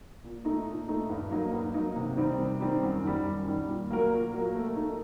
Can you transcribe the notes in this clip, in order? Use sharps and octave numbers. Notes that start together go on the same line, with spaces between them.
A#2
A3 D#4
A#2
A3 D#4
G2
F#3 A#3 D#4
G2
F#3 A#3 D#4
C3
D#3 G3 C4 D#4
C3
D#3 G3 C4 D#4
F#2
D#3 G3
F#2
D#3 G3
A#2
F#3 A#3 F#4 A#4
A#2
F#3 A#3 F#4 A#4
A3
D#4 A4